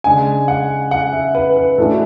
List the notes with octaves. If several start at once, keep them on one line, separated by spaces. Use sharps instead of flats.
C#3 G#3 D4 G#5
F#5
F#5
E5
B4
B4
A2 E3 G#3 D4 F#4 A4